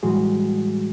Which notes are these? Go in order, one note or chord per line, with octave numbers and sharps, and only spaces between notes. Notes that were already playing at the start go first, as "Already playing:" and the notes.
A2 E3 G3 G#3 F#4 G#4